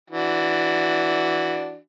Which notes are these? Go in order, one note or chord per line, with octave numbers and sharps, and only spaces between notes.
E3 D4 F#4